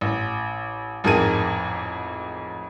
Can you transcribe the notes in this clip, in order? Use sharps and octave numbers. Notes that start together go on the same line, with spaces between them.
A1
A1 F2 G#2 G#4 A#4 D#7